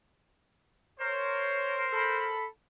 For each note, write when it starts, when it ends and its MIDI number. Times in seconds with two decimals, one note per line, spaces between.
1.00 2.38 70
1.00 2.38 72
1.00 1.82 73
1.91 2.45 69
1.91 2.45 81
1.91 2.45 83